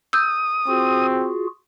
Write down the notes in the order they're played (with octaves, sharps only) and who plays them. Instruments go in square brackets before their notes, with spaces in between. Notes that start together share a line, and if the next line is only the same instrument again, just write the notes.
[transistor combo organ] D#6 [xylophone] E6 G6
[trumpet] C4 [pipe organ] F4 F#4 G#4